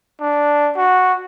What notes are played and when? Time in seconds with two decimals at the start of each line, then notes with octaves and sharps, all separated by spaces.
0.21 D4
0.77 F#4